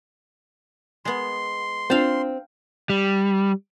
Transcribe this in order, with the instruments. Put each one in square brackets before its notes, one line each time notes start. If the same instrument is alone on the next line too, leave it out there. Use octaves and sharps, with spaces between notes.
[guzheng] G#3 B3 [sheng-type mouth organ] C6
[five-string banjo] C4 [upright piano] D4 F4 [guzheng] F5 A5
[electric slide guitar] G3